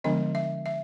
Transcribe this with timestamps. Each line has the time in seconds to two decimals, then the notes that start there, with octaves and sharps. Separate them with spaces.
0.04 D3 F3 G#3 B3 D4 D#5
0.35 E5
0.66 E5